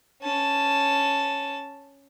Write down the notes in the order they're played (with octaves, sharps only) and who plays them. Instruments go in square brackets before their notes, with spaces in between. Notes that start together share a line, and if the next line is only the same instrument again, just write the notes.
[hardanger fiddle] C#4 A5